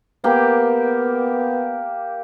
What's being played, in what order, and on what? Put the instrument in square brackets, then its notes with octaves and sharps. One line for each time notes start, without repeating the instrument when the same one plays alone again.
[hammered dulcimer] A#3 G4 [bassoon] B3